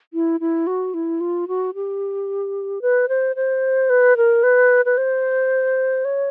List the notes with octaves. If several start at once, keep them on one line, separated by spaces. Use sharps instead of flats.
E4
E4
F#4
E4
F4
F#4
G4
B4
C5
C5
B4
A#4
B4
B4
C5
C#5